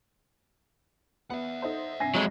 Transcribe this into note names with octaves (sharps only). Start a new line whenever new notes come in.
B3 E5 F#5
D#4 A4 C5
G2 C3 G#5 A#6 C7
F1 F2 F#3 G#3